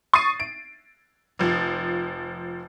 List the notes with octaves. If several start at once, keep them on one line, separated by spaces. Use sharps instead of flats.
C#6 D#6 A6 C7 D#7
D7
F1 F3